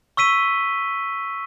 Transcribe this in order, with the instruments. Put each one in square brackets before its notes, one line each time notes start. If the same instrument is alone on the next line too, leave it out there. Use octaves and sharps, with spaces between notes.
[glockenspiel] C#6 E6 B6 D#7 G7